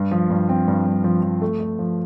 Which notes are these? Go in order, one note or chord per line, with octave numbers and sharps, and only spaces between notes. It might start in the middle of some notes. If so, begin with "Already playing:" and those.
Already playing: G2
F3
G2
C4
G2
G2
F3
F3
A3
A3
F3